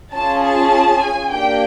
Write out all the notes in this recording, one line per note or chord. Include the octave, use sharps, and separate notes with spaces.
C#4 F4 G#4 A5
A5
G#5
A#3 D4 G4 G5